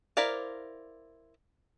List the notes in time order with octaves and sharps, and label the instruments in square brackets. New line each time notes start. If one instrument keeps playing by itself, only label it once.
[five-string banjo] E4 A#4 C5 D5 F5